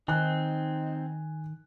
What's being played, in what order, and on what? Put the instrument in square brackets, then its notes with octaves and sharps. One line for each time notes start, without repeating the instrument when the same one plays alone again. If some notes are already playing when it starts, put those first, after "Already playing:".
[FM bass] D#3 [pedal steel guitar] C4 [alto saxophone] D#4 [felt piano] G#5 F#6